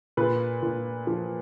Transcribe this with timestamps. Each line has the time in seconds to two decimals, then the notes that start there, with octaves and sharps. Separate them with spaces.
0.17 A#2 B4
0.63 A#2
1.07 F3